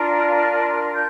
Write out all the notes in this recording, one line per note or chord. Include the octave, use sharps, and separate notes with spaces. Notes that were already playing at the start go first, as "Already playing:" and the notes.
Already playing: D4 F4 A#4
G6